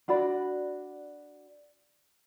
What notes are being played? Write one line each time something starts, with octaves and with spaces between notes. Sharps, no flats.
D4 F#4 D5 B5